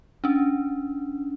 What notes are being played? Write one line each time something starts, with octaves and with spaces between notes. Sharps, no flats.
C#4 D4